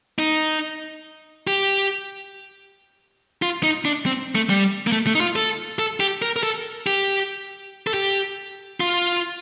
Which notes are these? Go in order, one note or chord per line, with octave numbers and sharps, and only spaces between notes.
D#4
G4
F4
D#4
D4
C4
A3
G3
A#3
A3
A3
D#4
F4
A4
A4
G4
A#4
A#4
A4
G4
A4
G4
F4